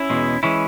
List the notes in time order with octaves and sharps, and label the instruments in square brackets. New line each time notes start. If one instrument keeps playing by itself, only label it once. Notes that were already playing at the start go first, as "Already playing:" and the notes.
Already playing: [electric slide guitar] C#4 E4
E2 B2 G#3
E3 G#3 C#4 E4